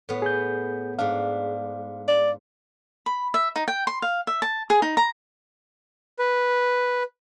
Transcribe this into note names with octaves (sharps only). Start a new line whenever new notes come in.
A2 B3
G#4 G6
G#2 D4 F5
D5
B5
E5
D#4
G5
C6
F5
E5
A5
G#4
D#4
A#5
B4